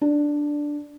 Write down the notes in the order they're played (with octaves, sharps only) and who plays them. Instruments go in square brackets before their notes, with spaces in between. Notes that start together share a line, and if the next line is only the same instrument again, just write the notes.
[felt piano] D4